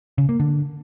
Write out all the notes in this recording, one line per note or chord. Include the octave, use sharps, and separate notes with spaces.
C#3
A#3
D3